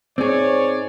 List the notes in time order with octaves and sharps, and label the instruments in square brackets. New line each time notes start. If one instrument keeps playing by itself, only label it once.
[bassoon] G#2 [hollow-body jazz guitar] C4 G#4 [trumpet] C#5 [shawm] D5